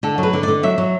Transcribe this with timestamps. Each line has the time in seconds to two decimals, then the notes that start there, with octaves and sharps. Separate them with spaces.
0.03 D3 A4
0.18 F#3
0.23 B4
0.33 D3
0.43 D5
0.48 D3
0.63 F#3 E5
0.78 F#3